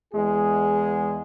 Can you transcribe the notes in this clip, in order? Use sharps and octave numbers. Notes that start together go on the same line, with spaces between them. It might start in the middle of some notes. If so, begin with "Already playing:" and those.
E2 G#3 G#4